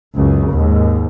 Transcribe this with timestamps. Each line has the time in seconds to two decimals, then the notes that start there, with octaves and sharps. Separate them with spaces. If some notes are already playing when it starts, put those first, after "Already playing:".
0.16 C#2 F#2 C#3
0.52 D#2 G#2